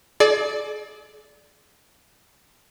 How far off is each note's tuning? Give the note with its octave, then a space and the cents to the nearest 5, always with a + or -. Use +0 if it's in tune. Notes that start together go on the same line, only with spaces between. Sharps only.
G#4 +45 D5 +5